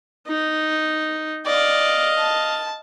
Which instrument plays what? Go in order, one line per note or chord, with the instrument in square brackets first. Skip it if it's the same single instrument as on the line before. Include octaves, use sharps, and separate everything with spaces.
[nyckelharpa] D#4
[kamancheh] D5 [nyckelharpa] D#5 F5
[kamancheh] A5